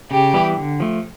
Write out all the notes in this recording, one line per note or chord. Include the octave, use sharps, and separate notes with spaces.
C#3 G4
E3 G3 B3 E4
D3
F3 A3